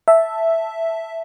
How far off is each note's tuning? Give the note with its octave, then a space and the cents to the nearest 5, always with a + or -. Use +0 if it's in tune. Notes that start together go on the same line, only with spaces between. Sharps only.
E5 +0 A5 +0